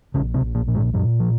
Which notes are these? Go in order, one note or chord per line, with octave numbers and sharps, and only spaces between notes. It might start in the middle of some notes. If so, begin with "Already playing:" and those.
A#1 C#3 C#4
C3 C4
A#1
A#2 A#3
A#2
G#2 G#3
F#2 A#2 F#3
F3